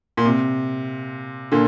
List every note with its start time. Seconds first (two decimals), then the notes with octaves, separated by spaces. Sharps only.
0.17 A#2
0.25 C3
1.52 A#2 D3